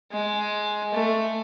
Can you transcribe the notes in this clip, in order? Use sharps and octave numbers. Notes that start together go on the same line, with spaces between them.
G#3
A3